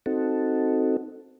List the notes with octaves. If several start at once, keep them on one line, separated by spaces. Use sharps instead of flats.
C4 D#4 F#4 A4